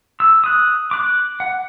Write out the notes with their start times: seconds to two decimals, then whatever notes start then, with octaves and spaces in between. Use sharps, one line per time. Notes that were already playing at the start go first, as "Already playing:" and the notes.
0.20 E6
0.44 D#6 F#6
0.91 D6 F#6
1.40 F#5